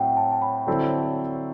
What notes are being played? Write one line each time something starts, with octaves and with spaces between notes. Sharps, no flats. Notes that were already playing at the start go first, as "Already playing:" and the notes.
Already playing: A2 F#3 C4 E5 F#5 G5
A5
A5
B5
D3 F#3 C4 E4 A4